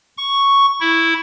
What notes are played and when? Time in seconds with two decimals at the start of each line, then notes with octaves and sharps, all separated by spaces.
0.17 C#6
0.80 E4